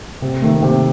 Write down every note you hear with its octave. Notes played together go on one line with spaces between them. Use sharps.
C3
D#3 A3
C3